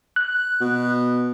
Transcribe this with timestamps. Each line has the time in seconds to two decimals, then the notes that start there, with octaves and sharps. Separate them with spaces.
0.16 F#6
0.61 B2